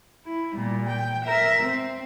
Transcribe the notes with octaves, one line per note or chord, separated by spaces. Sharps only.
E4
A#2 G3
G5
A#4 E5
C4